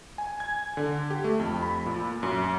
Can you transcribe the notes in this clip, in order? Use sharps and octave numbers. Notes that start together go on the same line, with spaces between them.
G#5
G#6
D3
G4
A3
F2
B5
A#2
F#2